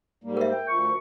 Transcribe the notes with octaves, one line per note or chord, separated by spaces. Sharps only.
G#2 G3 A#3
A#4 E5
G5
D2 F3 C#6